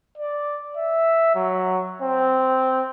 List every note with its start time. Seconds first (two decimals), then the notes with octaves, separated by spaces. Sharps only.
0.18 D5
0.77 E5
1.35 F#3
2.02 C4